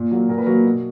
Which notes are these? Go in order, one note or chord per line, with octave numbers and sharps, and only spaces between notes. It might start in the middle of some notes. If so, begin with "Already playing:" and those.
Already playing: A#2
F#3 A#3
A#2 A#4
B4
F#3 A#3 F#4 A#4
B2